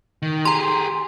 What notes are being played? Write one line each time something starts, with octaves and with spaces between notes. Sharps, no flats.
D#3
G4 G#4 A#5 C6